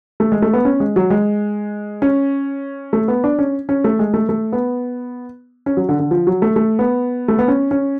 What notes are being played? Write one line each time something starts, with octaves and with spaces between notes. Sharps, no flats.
A3
G#3
A3
B3
C#4
G#3
F#3
G#3
C#4
A3
B3
D4
C#4
C#4
A3
G#3
A3
A3
B3
C#4
F#3
D3
D3
F3
F#3
A3
A3
B3
A3
B3
C#4
C#4